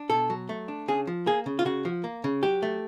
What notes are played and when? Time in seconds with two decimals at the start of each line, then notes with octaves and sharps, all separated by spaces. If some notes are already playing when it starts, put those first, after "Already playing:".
Already playing: D4
0.10 B2 A4
0.30 F#3
0.49 A3
0.68 D4
0.88 C#3 G#4
1.07 F3
1.26 A#3 G#4
1.46 C#3
1.59 F4
1.65 C#3 F#4
1.85 F3
2.04 A#3
2.24 C#3
2.43 F#3 G4
2.62 A3